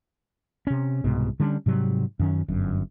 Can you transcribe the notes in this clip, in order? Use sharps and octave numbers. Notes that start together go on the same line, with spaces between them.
C3 C#4
C2 G#2 B2
D3 G3 C#4 D4
G#2 C3 F#3 G3
F#2 D#3 C#4
G1 F#2